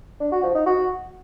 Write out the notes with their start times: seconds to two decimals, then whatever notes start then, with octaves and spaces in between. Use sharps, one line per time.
0.20 D4
0.32 F#4
0.43 F3
0.55 D#4
0.66 F#4